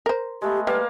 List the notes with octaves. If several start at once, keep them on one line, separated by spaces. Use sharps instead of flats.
A#4 C5
G#3 A3 B3 G4
G3 A#3 B4 F5